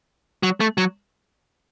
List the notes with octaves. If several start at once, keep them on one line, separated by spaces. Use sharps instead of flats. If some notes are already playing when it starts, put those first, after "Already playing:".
F#3
A3
F#3